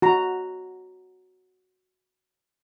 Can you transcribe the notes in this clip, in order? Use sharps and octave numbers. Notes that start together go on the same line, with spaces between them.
F#4 A#5